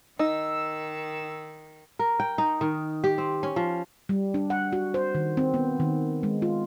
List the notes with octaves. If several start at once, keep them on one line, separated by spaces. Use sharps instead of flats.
D#3 D#4 E6
A#4
G5
D#4
D#3
G4
C4
C#4
F3
G3
D4
F#5
F#4
C5
D#3
C4
B3
D#3
G#3
F4